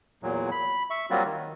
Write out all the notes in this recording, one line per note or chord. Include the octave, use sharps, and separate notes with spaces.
E2 A#2 F#3
B5
E5 C#6
F#3 G3 A#3 C4 F4 F#4
D#3